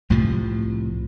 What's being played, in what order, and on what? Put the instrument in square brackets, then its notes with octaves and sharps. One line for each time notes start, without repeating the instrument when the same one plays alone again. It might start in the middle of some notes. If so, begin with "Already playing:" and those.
[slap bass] C2 A2 C3 F3